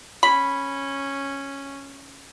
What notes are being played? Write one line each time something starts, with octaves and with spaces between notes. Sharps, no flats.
C#4 B5